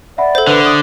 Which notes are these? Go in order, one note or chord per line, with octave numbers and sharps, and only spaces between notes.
D5 E5 F#5 B5
A4 C5
D3 B4
D#6